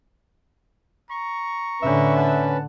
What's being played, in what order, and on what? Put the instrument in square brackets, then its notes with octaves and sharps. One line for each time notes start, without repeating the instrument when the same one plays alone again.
[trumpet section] A#5 C#6
[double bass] A2 D3 [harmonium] C#4 B4 [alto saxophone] E5
[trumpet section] F#5 A5